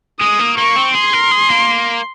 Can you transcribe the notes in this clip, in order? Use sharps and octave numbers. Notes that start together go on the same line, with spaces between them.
G#3 D#6
A#3
A#3 C#6
C4
G#4 C6
A#4
G#4
A#3